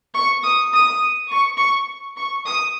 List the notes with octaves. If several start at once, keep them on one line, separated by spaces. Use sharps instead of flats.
C#6
D#6
D#6
C#6
C#6
C#6
D#6